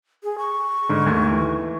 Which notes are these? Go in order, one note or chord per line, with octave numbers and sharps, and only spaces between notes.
G#4
C#6
G#2 D3
D#2 A3 G#6
E3